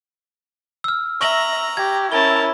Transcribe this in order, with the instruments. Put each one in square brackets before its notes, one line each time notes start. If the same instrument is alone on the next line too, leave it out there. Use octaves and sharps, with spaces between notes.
[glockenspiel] E6 F6
[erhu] E5 [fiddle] A#5 [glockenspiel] C#6 A#6 F#7
[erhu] G4 [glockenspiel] G#6
[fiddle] C#4 [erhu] E4 [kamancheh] A#4 A5 [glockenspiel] G7